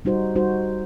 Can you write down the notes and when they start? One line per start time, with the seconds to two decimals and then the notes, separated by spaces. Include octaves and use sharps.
0.05 G3 D#4 F#4 C5
0.36 G3 D#4 F#4 C5